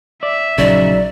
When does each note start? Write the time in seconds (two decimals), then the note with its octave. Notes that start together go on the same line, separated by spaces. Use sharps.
0.23 D5 E5
0.58 A#1 C#3 F#3 D#4 D5